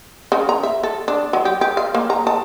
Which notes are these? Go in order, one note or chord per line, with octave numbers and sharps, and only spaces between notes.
C#3
A#5
E5
A4
D4
F#3
G4
G4
F5
A#3
A#5
A5